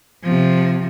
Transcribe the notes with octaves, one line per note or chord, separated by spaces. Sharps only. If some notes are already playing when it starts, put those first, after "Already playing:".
C3 F3